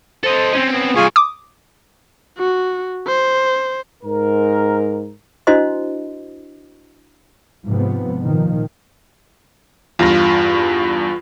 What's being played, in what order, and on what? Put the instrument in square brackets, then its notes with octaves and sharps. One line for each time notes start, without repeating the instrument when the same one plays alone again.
[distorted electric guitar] A4 D#5 [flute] C5
[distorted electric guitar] C4 C#4
[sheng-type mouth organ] B3
[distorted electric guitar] G2 C3 [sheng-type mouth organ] F4 G#4 G#5 [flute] C#6
[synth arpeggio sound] D6 D#6
[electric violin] F#4
C5
[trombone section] G#2 A#4
[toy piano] D4 E4 F#4 C5 D#5 C6
[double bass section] G#2 C3 F3 B3
A#2 D#3 F3
[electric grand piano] E2 G2 [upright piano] F4 A#6